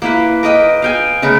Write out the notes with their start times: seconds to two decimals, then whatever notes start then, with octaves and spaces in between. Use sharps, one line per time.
0.02 A#3 E4 B4
0.43 A#4 B4 D#5 G5
0.82 F5 G5 G#5
1.22 C#3 A3 A#4 B4